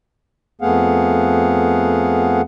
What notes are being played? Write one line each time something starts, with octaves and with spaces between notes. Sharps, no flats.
F2 A3 B3 G#4 F5 F#5